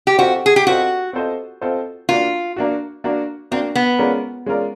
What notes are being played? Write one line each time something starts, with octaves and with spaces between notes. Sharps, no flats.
G4
C4 F4 F#4 A4 C5 D#5
G#4
G4
C4 F4 F#4 A4 C5 D#5
C4 F4 A4 C5 D#5
C4 F4 A4 C5 D#5
A#3 D4 F4 F#4
A#3 D4 F#4
A#3 D4 F#4
A#3 C4 D4 F#4
B3
G#3 C#4 F4 A#4 D5
G#3 C#4 F4 A#4 D5